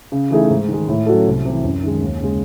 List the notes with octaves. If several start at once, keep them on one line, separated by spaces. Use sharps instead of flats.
C#3
E3 A3 D#4 G#4
G#2
D#3 G#3
A2
F#3 C#4 F#4 A4
C2
C3 E3
F#2
D#3 G#3
D#2
C#3 G#3